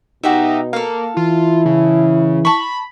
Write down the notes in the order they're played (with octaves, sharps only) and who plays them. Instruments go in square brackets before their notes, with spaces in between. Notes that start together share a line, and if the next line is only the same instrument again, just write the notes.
[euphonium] B2 [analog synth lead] D#4 [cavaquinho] F#4 G4 E5
[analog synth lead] A#3 [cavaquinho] A4 F5
[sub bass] E3 [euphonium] E4 [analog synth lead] F4
[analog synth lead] C#3
[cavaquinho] A5 C#6 [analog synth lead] B5